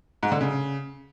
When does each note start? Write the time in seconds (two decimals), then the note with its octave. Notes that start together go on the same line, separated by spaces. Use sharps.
0.23 G#2
0.32 D3
0.41 C#3